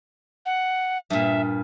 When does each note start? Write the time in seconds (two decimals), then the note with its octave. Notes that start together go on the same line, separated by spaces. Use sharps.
0.46 F#5
1.10 G2 A#2 E5